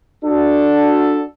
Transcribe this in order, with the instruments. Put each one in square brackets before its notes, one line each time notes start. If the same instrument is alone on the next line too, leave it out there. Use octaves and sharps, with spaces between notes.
[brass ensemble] D4 F#4 A4